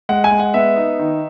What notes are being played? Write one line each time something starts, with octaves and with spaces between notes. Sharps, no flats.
G#3 F#5
G#5
G#3
F#5
B3 E5
D#4
D#3